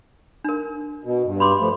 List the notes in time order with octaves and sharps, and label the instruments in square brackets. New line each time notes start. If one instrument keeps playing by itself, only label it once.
[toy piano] D4 A#4
[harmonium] B2
G2
[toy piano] B5 C6 D6
[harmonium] F3 A3